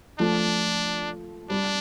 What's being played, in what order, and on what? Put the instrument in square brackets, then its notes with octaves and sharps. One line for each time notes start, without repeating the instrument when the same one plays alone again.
[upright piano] F3 A3 [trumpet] D4
[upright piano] G3 [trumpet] D4